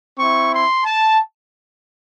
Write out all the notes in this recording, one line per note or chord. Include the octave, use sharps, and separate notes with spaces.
C4 E4 C#6
C6
A5